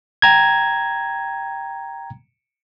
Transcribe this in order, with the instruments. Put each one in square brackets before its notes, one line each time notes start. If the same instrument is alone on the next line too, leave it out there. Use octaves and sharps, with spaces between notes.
[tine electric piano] G5 A#5 G#6